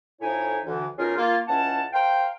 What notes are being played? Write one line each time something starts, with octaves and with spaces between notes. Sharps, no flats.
F2 A2 D#4 E4 C#5 G#5
D2 D3 E3
B2 C#4 D#4 F4 G#4 A#4
A#3 F4
C#2 E3 C#4 F#5 A5
A#4 C5 F5 G5